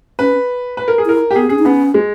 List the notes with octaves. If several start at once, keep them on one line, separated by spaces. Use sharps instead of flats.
C#4 B4
B4
A#4
G#4
E4 A#4
G4
B3 G#4
C#4 G#4
D#4
B3 C#4
G#3